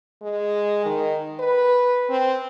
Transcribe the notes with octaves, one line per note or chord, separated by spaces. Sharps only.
G#3
D#3
B4
C4